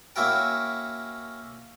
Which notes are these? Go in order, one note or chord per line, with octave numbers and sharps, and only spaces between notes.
A#3 C#4 E4 F#4 A#4 G5